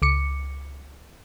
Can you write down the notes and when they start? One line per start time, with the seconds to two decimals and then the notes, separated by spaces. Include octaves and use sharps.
0.02 C#2 D6 C#7